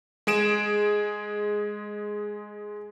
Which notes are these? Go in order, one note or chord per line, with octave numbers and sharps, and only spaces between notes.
G#3 G#4 D7 E7